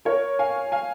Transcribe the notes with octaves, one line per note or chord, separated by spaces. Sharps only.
A#4 C#5
F5 G#5
F5 G#5